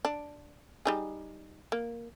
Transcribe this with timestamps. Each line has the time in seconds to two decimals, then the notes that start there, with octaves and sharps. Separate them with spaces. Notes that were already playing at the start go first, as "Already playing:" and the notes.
0.05 D4
0.85 G3 D#4 G#4
1.72 A#3